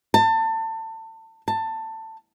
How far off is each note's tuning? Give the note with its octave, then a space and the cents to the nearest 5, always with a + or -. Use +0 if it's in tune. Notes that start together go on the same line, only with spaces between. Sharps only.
A5 +30
A5 +20